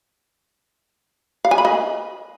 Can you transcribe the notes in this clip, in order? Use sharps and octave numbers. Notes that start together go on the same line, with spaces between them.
F5
G#5
B5
D#5